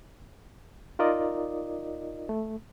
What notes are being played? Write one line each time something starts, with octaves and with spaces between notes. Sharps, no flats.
D#4 F4 A#4 D5 D#5
A3